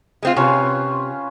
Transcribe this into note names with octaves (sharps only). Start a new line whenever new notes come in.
G#3 C4 F4
C3 C#4 F4 B4